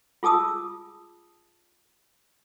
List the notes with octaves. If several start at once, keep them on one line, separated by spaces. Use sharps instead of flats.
F4 G#4 A5 D#6 E6